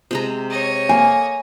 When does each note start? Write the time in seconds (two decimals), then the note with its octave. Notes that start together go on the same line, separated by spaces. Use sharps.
0.11 C3 G#3 A#5
0.50 C#5 D#5
0.89 A#3 G#5